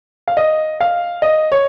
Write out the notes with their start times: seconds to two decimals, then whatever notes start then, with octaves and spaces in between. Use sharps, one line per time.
0.28 F5
0.37 D#5
0.80 F5
1.22 D#5
1.52 C#5